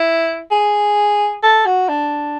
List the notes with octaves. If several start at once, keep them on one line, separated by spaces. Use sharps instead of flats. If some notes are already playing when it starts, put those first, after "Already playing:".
Already playing: E4
G#4
A4
F#4
D4